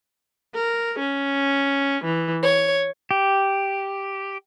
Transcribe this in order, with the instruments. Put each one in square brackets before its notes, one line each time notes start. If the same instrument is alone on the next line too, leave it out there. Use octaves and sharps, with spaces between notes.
[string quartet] A#4
C#4
E3
C#5
[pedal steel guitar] G4